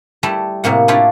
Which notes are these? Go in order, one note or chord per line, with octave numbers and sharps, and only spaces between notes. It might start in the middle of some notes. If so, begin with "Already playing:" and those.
G3 A3 E4 A5
A2 C3 A#3 F#5
D4 E4 F4 G4 C#5 D5